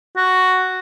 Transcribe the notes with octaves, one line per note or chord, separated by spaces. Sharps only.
F#4